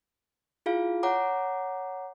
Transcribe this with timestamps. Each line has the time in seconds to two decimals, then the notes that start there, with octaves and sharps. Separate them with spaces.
0.66 E4 F4 G#4 F5
1.03 C#5 F#5 A#5 D6